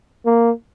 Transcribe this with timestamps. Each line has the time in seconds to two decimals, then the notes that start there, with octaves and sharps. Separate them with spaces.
0.26 A#3